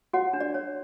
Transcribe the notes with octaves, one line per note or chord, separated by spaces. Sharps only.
F#4 C#5 F#5
D4
D5
C#5